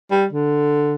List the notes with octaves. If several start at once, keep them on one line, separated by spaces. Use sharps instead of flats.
G3
D3